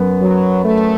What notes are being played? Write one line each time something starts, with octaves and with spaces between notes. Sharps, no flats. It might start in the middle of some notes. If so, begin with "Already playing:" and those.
Already playing: F#2 B3
F#3
A3